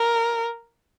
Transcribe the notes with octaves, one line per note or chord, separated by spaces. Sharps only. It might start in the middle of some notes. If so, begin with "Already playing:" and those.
Already playing: A#4